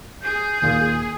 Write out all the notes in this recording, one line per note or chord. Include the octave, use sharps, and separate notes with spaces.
G#4 G6
D#2 A#2 F4